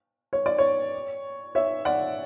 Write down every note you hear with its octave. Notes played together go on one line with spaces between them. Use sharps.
C#5
D5
C#5
C#5 E5
D5 F#5